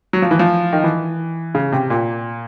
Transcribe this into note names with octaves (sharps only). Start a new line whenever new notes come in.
F#3
F3
E3
F3
D#3
E3
C#3
C3
A#2